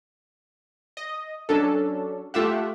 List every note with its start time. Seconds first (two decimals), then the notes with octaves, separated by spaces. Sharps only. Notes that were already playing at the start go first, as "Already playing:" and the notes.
0.97 D#5
1.49 F#3 C#4 D4 A4
2.34 A3 F4 G4 E5 F#5